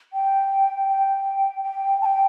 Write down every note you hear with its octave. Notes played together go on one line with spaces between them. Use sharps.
G5
G5
G5
A5
G5